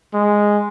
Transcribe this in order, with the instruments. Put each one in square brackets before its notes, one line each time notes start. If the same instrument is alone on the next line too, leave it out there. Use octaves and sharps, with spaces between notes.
[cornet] G#3